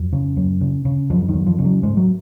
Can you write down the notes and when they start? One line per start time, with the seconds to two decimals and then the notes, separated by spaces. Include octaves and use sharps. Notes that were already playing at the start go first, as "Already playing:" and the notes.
Already playing: F2 F#3
0.13 C#3
0.37 F#2
0.61 C#3
0.85 C#3
1.10 F#2 F3
1.28 D#3
1.34 F#2
1.46 F3
1.59 C#3
1.65 F#3
1.83 G#2 G#3
1.97 F#3